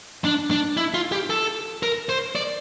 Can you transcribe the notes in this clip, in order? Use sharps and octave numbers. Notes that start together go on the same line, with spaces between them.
D4
D4
E4
F4
G4
A4
A#4
C5
D5